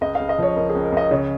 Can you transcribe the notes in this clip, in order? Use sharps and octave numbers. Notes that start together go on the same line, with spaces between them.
C#2 D#5
C#2 F5
D#5
F3 C#5
C#2 A#4
G#4
C#2
A#4
C#2 D#5
C#3 C#5